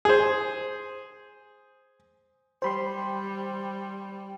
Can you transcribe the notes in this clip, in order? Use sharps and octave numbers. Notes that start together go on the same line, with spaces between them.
G#4 C5
G3 C5 B5 C6